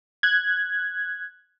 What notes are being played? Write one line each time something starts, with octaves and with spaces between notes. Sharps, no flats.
F#6 G#6